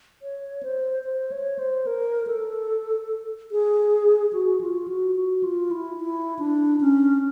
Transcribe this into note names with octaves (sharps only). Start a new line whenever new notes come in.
C#5
C5
C5
C#5
C5
A#4
A4
G#4
F#4
F4
F#4
F#4
F4
E4
E4
D4
C#4